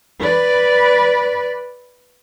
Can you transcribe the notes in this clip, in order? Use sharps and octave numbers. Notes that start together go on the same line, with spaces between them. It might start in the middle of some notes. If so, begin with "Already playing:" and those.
B4 D5